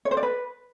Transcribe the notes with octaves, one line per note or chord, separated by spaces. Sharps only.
C#5
C5
D5
B4